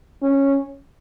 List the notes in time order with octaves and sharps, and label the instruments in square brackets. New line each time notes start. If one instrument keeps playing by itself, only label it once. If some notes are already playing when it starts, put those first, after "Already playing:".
[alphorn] C#4